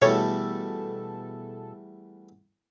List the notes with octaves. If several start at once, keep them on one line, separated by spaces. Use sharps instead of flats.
E2 B2 G3 A3 A4 C#5